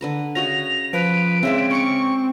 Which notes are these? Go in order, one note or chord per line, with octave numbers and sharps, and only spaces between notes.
D3 B4 A#5
C#3 F#4 D#5 A#6 F7
F3 B4 D7
C#3 G#3 C4 D5 E5
C#4 C#6 D6